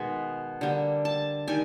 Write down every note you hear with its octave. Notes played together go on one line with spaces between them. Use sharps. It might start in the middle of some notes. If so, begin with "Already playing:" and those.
Already playing: B2 D#3 G#3 B3 G#5
D3 G3 A#3
A5
D#3 G3 G#5